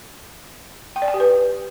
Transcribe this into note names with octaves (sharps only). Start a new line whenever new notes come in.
G5
D5
G#5
G4
B4